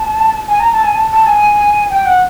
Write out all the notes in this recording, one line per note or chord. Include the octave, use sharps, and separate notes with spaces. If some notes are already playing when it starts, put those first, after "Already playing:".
Already playing: A5
G#5
A#5
A5
G#5
A5
A5
G#5
G5
F#5